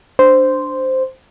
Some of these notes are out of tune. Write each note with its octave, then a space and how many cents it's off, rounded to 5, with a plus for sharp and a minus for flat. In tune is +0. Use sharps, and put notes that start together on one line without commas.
D4 +0 C5 -5